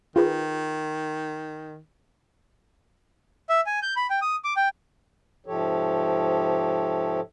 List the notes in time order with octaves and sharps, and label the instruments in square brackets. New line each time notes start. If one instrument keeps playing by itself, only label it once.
[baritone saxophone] D#3 [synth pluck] F4 G#4 B4
[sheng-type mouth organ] E5
G#5
G6
B5
G5
D#6
D6
G5
[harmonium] G#2 C3 F3 G4 A4 C#5